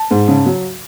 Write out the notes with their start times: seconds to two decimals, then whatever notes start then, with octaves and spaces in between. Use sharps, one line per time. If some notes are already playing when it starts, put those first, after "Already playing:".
Already playing: A5
0.11 G#2
0.28 C#3
0.46 F#3